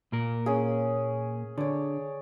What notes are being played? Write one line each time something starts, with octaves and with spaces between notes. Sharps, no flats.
A#2 A#3 A#4
C#4 G#4
D3 C#5 D5